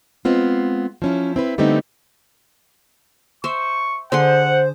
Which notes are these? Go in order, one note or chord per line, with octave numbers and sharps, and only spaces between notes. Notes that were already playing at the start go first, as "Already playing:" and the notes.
G#3 B3 C4 F4
F3 C#4 E4
C4 E4 B4
D3 G3 A3 B3 C4 D#4
C5 E5 C#6
D3 G#4 C5 F#5 C6